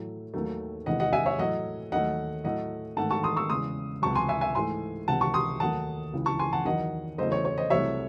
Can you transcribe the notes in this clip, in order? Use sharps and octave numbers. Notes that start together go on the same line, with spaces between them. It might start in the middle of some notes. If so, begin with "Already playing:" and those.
Already playing: A2 F#3 A3
D#2 D#3 F#3 A3
E2 C3 D#3 G#3 D#5 F#5
D#5 F#5
E5 G#5
C#5 E5
A2 F#3 A3 D#5 F#5
D#2 D#3 F#3 A3 D#5 F#5
A2 F#3 A3 D#5 F#5
G#2 D#3 A3 F#5 A5
A5 C#6
C6 D#6
C#6 E6
E2 C#3 G#3 C6 D#6
C#2 C3 F#3 A5 C#6
G#5 C6
E5 G#5
E5 G#5
G#2 E3 A3 G#5 C6
C#2 C3 D#3 F#5 A5
A5 C#6
C6 D#6
D#2 D#3 F#3 A3 F#5 A5
C#2 C#3 E3
A5 C#6
G#5 C6
F#5 A5
E2 D#3 F#3 D#5 F#5
E2 C#3 F#3 A3 C5 D#5
C#5
C#5
C5 D#5
C2 C3 F#3 A3 C#5 E5